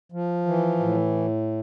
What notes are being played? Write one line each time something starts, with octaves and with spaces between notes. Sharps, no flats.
F3
E3
A2